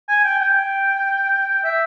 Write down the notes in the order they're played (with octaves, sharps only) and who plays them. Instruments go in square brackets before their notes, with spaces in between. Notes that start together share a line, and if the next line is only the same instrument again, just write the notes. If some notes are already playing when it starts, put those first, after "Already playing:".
[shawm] G#5
G5
G5
E5